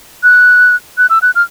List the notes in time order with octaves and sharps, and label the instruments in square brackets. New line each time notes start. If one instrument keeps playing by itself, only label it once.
[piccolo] F#6
F#6
E6
F#6
F6